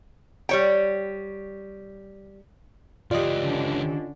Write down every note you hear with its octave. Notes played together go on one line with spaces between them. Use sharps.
G3 C#5 G5
C#2 E3 F4 G4 D5 D#5
D3 C#4 D4